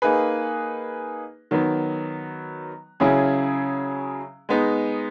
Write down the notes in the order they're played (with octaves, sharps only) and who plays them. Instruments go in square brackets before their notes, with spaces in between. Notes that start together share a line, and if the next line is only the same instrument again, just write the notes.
[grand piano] A#3 D#4 G#4 B4
D#3 F#3 B3
C#3 F#3 C#4 E4 G#4
G#3 B3 D#4